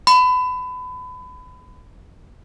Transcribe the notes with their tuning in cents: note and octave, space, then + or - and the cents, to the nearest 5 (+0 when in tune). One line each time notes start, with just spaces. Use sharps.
B5 +30